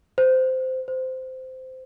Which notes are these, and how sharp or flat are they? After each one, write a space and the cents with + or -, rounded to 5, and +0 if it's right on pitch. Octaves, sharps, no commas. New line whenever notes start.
C5 -15
C5 -15